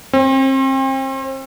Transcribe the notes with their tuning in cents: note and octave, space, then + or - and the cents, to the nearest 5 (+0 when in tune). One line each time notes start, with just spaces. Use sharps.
C4 +35